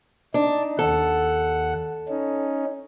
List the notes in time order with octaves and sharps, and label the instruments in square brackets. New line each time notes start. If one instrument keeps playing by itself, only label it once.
[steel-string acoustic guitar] D4 [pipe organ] D#4
[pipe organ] D#2 F#5 [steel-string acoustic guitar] A4
[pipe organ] C#4 D#4